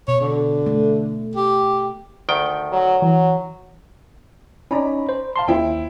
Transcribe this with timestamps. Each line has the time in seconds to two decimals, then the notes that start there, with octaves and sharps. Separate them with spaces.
0.08 B2 C#5
0.21 D3
0.66 A3
1.35 G4
2.29 D2 D#3 G5
2.72 F#3
3.02 E3 F#3
4.71 C#4 D#4 D5 A#5 B5
5.09 C5
5.36 F5 A5 C6
5.48 D#2 E4 C5 G5